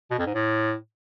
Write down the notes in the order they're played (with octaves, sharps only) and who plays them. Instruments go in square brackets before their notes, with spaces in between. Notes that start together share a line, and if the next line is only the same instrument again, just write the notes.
[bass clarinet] B2
F2
G#2
A2